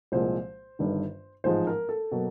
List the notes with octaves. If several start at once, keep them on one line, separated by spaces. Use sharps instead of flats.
C2 A#2 F3 G#3 C5
G1 G2 D#3
A1 G#2 F3 G#3 C5
A#4
A4
B2 F#3 A#3